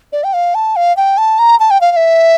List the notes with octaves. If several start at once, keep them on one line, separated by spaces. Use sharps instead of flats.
D5
G5
F5
A5
F5
G5
A5
A#5
A5
G5
F5
F5
E5